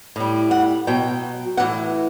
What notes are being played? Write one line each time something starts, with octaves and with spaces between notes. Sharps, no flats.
A2 G3
F#5
B2 F#3 G5
A2 E3 F#5